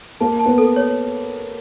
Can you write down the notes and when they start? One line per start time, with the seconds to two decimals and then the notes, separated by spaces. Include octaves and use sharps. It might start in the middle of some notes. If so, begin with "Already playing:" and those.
0.20 A#3 A5
0.39 A5
0.46 B3
0.58 A4
0.76 C#5